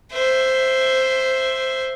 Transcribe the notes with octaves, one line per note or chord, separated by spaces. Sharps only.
C5 E5